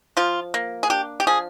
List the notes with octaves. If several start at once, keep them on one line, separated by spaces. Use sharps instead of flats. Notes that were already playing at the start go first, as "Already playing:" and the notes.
F3 F4
A#3
G#4
D4 G4
G4
F3 G#4